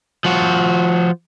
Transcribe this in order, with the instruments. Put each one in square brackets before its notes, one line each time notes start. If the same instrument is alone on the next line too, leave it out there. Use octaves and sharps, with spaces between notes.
[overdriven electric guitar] F3 F#4